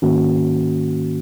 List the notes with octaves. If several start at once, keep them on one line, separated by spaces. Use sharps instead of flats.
G#2 D#3 A#3 C#4 F#4